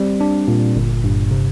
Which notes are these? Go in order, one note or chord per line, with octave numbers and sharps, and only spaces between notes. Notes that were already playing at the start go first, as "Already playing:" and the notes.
Already playing: G3 C4
D4
A#2
G1
G2
C3